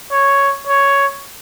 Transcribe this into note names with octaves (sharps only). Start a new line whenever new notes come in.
C#5
C#5